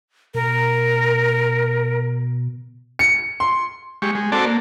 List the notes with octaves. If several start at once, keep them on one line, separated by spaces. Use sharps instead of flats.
B2 A#4
C#7
C6
G#3 G4 C#6
G#3
C4 F#4 A4 D5 A5
A#3